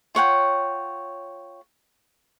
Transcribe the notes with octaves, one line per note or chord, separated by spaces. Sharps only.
F4 C#5 F#5 G5